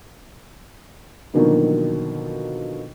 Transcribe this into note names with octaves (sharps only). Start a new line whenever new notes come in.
B2 D3 D#3 F3 F#3 A#3